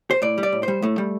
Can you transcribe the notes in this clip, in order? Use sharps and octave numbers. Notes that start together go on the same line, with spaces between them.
C5
A2 D5
G3
D5
A2
G3 C5
A2 A3
G3